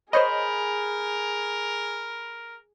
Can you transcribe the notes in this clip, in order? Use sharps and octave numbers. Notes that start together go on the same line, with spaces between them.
G#4 A#4 C5 C#5 D#5 B5 G6